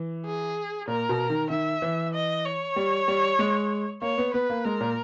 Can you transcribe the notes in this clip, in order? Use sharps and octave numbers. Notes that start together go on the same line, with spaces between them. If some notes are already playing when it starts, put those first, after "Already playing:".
Already playing: E3
G#4
A#2 A#4
B2
D#3
D#3 E5
E3
D#5
C#5
G3
G3
G#3
A#3 C#5
B3
B3 B4
A#3
G#3 A#4
A#2